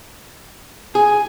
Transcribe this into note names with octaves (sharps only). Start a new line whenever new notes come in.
G#4 G#5